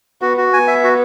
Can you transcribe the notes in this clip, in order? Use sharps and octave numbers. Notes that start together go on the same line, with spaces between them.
B3 F#4
F#4
B3 G#5
E5
F#4